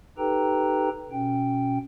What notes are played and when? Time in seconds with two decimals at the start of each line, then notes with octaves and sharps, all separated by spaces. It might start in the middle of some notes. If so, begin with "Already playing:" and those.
0.18 D#4 G4 A4 B4 G5 A#5
1.11 B2 C#4 G5